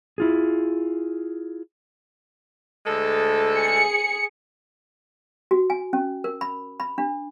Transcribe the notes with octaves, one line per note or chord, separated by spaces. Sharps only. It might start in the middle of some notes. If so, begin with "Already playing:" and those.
E4 F4 G#4
D2 G#3 A4
G#4 C#7
F#4
G#5
C#4
A#4
B5
B5
D4